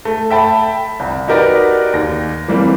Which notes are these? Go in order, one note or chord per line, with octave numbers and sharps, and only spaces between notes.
A3
E5 G5 A5 B5
C2
D#4 F#4 G4 A#4 B4 D5
D#2 A#6
E3 G3 A#3 C4